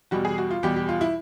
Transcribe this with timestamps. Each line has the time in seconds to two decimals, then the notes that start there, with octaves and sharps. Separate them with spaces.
0.11 E2 B2 G3 F#4
0.25 G#4
0.38 F#4
0.51 F4
0.63 E2 B2 G3 G4
0.76 G4
0.89 F4
1.01 E4